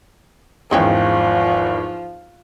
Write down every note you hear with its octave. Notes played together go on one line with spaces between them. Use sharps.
G#1 E2 F3 G#3 C#4 G5